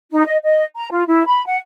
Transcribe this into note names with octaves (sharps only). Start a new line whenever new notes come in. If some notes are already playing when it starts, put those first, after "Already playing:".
D#4
D#5
D#5
A#5
F4
E4
B5
F#5